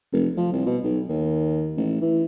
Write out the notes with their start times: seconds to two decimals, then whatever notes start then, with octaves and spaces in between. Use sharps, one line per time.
0.13 F1
0.37 F3
0.52 C2
0.66 B2
0.84 B1
1.09 D#2
1.77 A1
2.01 E3